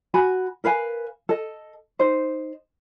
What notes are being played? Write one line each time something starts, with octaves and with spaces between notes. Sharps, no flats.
F#4 G#5 B5
A#4 B4 F5 G#5
A4 D#5
D#4 C5